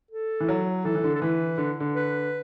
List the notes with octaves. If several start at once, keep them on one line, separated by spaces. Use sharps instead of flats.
A4
E3
F#3
E3 A4
E3
D3
A4
E3 B4
D3
D3
B4